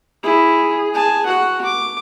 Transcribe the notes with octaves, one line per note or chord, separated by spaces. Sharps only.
E4 G#4
G#5 A5
F#4 F#5
D6